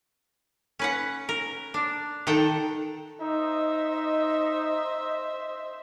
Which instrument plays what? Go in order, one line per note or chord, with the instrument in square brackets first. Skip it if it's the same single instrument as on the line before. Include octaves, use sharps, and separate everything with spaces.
[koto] C#4 B4 F#5
A#4
D4
D#3 A4 F#5 G5
[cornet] D#4 [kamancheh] C5 E5 [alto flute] D#5